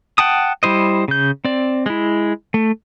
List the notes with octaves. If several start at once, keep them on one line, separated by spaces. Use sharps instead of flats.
F#5 G5 A5 D#6
G3 E4 C5 D#5
C#3 G6
C4 D5
G#3 E4
A3